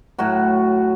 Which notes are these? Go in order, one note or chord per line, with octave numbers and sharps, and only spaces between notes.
A2 F#3 F#4